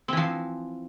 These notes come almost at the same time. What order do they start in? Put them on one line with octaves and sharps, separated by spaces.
C4 E3 F3